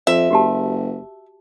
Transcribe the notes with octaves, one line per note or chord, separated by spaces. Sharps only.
F2 E5
F#1 F#4 G4 A5